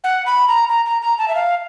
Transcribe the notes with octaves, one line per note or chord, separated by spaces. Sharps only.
F#5
B5
A#5
A#5
A#5
A#5
A5
E5
F5